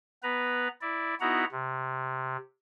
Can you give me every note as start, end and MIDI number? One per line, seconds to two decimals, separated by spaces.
0.23 0.68 59
0.23 0.68 71
0.23 0.68 82
0.81 1.14 64
0.81 1.14 74
1.20 1.45 59
1.20 1.45 63
1.20 1.45 64
1.20 1.45 66
1.20 1.45 78
1.20 1.45 82
1.52 2.37 48